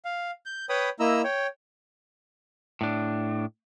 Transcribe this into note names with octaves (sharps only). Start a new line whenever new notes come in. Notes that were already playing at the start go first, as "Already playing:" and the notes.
F5
G6
B4 C#5 G5 B5 D#6
A#3 E4 D#5 A#5 E6
C#5 G5
A2 D4